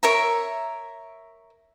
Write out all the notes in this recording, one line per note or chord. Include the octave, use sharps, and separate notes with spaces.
A#4 C#5 E5 A#5